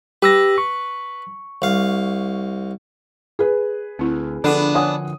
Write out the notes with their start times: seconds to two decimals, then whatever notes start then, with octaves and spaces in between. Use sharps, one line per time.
0.22 G4 B4 E6 A#6
0.58 C#6
1.62 C2 F5
3.39 G#4 B4
3.99 D2 C4 E4
4.44 D3 F3 B3 D4 A4
4.75 C#5 F#5 G#5 D#6